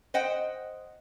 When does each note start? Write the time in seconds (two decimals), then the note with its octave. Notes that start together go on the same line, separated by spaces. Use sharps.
0.14 C5 D#5 F#5 G5